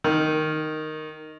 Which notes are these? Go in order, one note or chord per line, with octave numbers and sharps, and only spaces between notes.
D#3